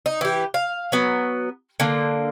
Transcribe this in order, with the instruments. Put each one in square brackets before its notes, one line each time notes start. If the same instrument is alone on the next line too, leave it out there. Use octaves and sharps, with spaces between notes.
[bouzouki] D#4
E3 G4
F5
F#3 B3
D3 A#3